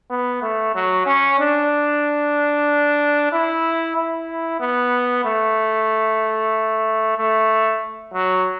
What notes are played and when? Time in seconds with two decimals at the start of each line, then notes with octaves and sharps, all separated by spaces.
0.10 B3
0.42 A3
0.75 F#3
1.06 C#4
1.39 D4
3.32 E4
3.96 E4
4.60 B3
5.25 A3
7.17 A3
8.13 F#3